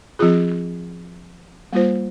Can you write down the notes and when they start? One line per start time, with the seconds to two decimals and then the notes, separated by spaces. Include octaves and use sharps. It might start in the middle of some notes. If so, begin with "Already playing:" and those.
0.19 F3 C4 F4 G#4
1.73 G3 A#3 F4 C5